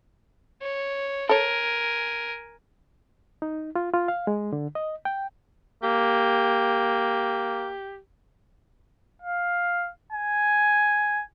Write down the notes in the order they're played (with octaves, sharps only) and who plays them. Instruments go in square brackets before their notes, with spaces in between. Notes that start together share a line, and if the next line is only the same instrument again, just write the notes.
[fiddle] C#5
[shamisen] A4 C#5 [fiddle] A#4 G#5
[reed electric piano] D#4
F4
F4
F5
G#3
D3
D#5
G5
[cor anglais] A#3 [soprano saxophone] G4
[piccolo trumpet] F5
G#5